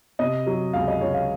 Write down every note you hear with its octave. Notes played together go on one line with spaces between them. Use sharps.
C3 D#5
F#3
C#2 F5
D#5
C#2 C#5
F5